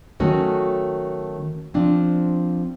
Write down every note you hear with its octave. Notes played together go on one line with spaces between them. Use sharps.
D#3 F#3 A3 C#4 F#4 A4
F3 C4 D4